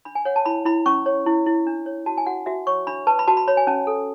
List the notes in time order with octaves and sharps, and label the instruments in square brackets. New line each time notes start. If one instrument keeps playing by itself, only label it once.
[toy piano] D4 B5
G#5
C#5 F#5
A5
E4 B5
E4 B5
C#4 C#6
C#5
E4
E4
D4
C#5
F#4 A5
G#5
F#4 F#5
F#4 E5
C#5 C#6
D4 B5
B4 A5
B5
F#4 A5
B5
C#5 B5
G#5
C#4 A5
A4